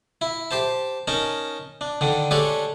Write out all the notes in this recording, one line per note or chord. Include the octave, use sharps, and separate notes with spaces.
E4
G4 C5 A5
C#4 D#4 A#4 A5
D4
D3 D#3 D4
G#3 D4 G4 A4 C#5